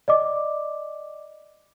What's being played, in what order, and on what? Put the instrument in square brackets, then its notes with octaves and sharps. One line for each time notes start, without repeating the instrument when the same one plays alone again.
[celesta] D5 D#5 D6